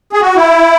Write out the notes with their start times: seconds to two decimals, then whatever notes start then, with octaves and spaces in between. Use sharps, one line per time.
0.13 G#4
0.21 F#4
0.36 E4